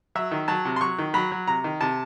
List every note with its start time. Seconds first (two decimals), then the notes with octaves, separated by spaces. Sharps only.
0.15 F#3 E5
0.31 D#3
0.48 F#3 A5
0.65 C3
0.76 C6
0.81 F#3 C#6
0.98 D#3
1.14 F#3 B5
1.32 F#3
1.47 C3 A#5
1.64 D#3
1.81 C3 A5